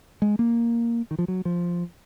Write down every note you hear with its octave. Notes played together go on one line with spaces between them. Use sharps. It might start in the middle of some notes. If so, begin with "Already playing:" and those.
G#3
A#3
D#3
F3
F#3
F3